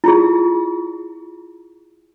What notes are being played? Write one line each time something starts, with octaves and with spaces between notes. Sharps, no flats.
E4 F4 G#4